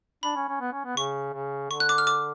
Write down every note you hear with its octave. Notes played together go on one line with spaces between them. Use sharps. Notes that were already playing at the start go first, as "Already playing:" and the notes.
D4 B5
C#4
C#4
B3
C#4
B3
C#3 C#6
C#3
D3 C#6
F#6
D6
F6
D6